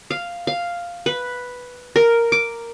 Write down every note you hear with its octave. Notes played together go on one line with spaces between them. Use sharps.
F5
F5
B4
A#4
D6